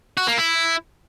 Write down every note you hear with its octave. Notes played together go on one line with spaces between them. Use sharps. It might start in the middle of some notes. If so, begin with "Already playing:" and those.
F#4
A#3
E4